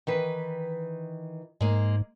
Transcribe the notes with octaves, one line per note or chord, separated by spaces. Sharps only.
D#3 E3 B4
G#2 G#3 A#3